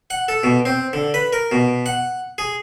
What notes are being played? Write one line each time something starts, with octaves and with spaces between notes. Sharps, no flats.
F#5
A4
B2
C4
D3
B4
A#4
B2
F#5
G#4